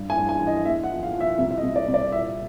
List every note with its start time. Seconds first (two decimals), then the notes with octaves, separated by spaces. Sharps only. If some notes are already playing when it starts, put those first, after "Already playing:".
Already playing: G2
0.10 G#5
0.16 G2
0.29 G#5
0.41 E3
0.47 D#5
0.65 E2 E5
0.83 F#5
0.90 F3
1.03 F5
1.15 F3
1.20 E5
1.38 C2 E5
1.51 E5
1.58 D#5
1.63 C2
1.76 D5
1.88 C2
1.94 D5
2.12 A#2 E5